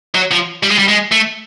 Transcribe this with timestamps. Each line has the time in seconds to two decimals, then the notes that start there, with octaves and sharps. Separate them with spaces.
0.15 F#3
0.32 F3
0.63 G3
0.71 G#3
0.78 G3
0.88 G#3
1.12 A3